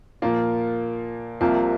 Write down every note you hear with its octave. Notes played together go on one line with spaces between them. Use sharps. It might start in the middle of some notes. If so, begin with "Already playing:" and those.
A#2 F3 A#3 F4
C2 C3 F3 A#3 F4